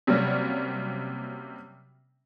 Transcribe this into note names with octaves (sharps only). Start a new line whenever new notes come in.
C3 F#3 G3 A#3 C#4